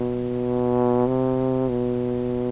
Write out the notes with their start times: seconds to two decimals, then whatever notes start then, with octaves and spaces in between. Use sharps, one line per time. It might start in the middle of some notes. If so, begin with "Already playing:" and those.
Already playing: B2
1.08 C3
1.70 B2